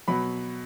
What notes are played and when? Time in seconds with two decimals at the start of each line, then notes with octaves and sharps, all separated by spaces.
0.08 B2 F#3 B5